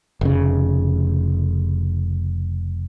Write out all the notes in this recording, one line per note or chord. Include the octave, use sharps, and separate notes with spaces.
F1 C#3